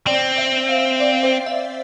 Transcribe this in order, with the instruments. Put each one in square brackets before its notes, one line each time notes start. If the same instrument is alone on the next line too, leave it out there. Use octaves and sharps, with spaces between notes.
[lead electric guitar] C4 [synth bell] D5
[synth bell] E5
F5
D5
C5
E5